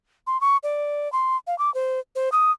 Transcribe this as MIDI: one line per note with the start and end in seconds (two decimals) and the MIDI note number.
0.27 0.40 84
0.41 0.57 85
0.63 1.11 74
1.13 1.36 84
1.47 1.57 77
1.58 1.73 86
1.74 2.00 72
2.16 2.29 72
2.32 2.51 87